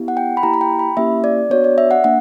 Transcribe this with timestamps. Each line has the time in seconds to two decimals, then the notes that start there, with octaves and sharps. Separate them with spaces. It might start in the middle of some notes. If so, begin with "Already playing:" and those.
Already playing: B3 E4 G4
0.08 F#5
0.17 G5
0.37 B5
0.43 A#3 E4 G4 A#5
0.54 A#5
0.61 G5
0.79 B5
0.97 A#3 C#4 E4 G4 E5
1.24 D5
1.50 B3 D4 F#4 C#5
1.64 D5
1.78 E5
1.91 F#5
2.04 A#3 D4 F#5